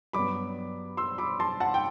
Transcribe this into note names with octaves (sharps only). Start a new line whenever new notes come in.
G2 F#3 B3 B5 D6
C6 E6
B5 D6
A5 C6
F#5 A5
G5